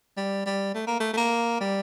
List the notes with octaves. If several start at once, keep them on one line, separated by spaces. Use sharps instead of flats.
G3
G3
A3
A#3
A3
A3
A#3
G3